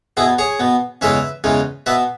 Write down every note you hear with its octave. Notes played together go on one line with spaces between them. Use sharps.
B2 B3 E4 G#4
G#4 C#5
B2 B3
E2 C#3 E3 G#3 C#4 B4 E5
E2 C#3 E3 G#3 C#4
B2 B3 B4 E5